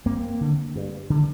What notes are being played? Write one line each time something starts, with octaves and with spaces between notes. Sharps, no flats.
G2 A#3 C4
D3
G2
D3